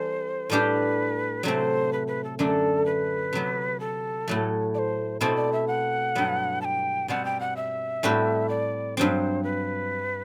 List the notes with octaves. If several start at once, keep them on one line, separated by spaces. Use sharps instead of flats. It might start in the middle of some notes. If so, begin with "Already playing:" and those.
Already playing: E3 G3 C4 A4 C5
A2 G3 D4 G4 B4
C3 F#3 A3 C4 C5 D5
B4
B4
A4
F#2 D3 A3 D4 A4
B4
C3 F#3 B3
A4
A2 F#3 A3
D5
C5
B2 A3 C4 E4 C5
D5
E5
F#5
G2 F#3 B3
A5
G5
B2 G3 C4 F#5
G5
F#5
E5
A2 G3 C4 F#4 B4
D5
G2 F#3 C4 C5
B4